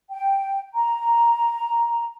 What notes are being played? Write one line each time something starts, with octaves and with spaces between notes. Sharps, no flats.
G5
A#5